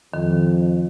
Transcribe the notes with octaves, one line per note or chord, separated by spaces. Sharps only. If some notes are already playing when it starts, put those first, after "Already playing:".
F2 D#3